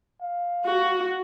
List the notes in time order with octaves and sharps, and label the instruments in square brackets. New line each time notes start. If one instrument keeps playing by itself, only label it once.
[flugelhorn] F5
[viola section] F#4